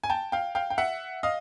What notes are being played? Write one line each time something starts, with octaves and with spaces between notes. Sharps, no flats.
G#5
G5 A5
F5 G5
F5 G5
G5
E5 F#5
D#5 F5